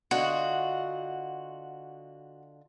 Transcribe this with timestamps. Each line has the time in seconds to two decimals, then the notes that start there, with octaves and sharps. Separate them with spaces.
0.11 D3 F4 F#4 D#5